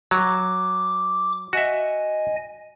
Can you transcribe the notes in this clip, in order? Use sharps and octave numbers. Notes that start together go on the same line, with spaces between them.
F#3 D6
F#4 D#5 E5 G#5